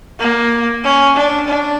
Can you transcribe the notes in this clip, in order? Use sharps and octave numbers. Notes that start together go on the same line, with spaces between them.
A#3
C#4
D4
D4